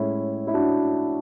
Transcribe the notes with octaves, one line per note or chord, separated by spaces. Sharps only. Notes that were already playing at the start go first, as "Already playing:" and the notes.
Already playing: A2 G#3 C#4 E4
E4
D4 F#4